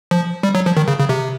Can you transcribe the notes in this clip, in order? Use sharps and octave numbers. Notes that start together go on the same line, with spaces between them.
F3
G3
F#3
F3
D#3
C#3
C#3
C3